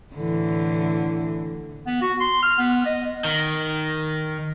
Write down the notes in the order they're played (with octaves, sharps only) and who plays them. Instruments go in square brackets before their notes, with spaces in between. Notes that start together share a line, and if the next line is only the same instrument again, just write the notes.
[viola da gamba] A2 D3 E3
[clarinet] B3
F#4
C6
F6
B3
D#5
[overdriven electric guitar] D#3